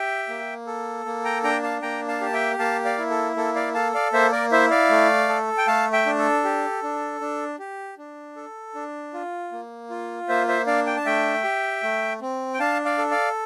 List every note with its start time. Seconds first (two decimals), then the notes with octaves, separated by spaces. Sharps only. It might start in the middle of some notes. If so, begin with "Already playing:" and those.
Already playing: G4 E5 G5
0.29 A#3
0.67 A4
1.06 A#3
1.25 G5 A#5
1.44 D4 G5 A#5
1.63 F5 A5
1.82 A#3 G5 A#5
2.08 F5 A5
2.21 G4 A5
2.33 E5 G5
2.59 A#3 F5 A5
2.85 D5 F5
2.98 E4
3.10 A4
3.36 A#3 A4
3.55 D5 F5
3.75 A4 F5 A5
3.94 D5 F5
4.13 A#3 C5 E5
4.32 A#4 D5
4.52 E4 C5 E5
4.70 D5 F5
4.90 A3
5.29 A4
5.58 G5
5.67 A3 F5 A5
5.93 E5 G5
6.06 D4
6.19 A4
6.44 G4
6.83 D4
7.21 D4
7.59 G4
7.98 D4
8.36 A4
8.75 D4
9.13 F4
9.52 A#3
9.90 F4
10.29 A#3 C5 E5
10.48 C5 E5
10.67 D4 D5 F5
10.86 G5
10.97 A5
11.06 A3 E5 G5
11.44 G4
11.83 A3
12.21 C4
12.54 G5
12.60 D4 F5 A5
12.85 D5 F5
12.98 A4
13.11 D5 F5